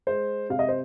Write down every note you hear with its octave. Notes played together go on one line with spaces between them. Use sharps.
G#3 C5
C3 F5
D#5
C5